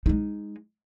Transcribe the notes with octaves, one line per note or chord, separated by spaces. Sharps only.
G#3 D#4